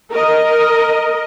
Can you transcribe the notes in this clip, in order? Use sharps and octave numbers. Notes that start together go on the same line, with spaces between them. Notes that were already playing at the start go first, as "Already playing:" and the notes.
A#4 D#5